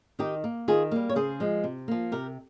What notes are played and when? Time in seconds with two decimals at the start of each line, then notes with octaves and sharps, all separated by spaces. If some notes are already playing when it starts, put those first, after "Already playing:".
0.19 D#3 D#4 G4
0.44 A#3
0.68 D#3 F4 G#4
0.91 G3 A#3
1.09 C#5
1.15 C#3 G#4 C5
1.40 F3 G#3
1.64 C3
1.88 F3 A#3
2.12 C3 G4 A#4